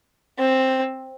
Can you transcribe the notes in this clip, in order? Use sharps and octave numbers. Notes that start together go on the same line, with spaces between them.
C4